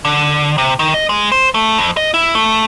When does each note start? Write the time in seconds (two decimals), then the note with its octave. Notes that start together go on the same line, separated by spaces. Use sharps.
0.05 D3
0.58 C3
0.79 D#3
0.94 D#5
1.09 G#3
1.32 C5
1.54 A3
1.79 F2
1.97 D#5
2.14 E4
2.35 A3